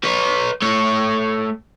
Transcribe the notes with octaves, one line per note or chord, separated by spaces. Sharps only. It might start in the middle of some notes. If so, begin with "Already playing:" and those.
B4 C#5
A3 C#5